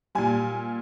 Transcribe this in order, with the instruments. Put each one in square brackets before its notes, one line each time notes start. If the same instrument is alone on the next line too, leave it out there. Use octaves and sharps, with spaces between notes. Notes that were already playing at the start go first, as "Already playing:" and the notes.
[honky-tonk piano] A#2 G3 G#5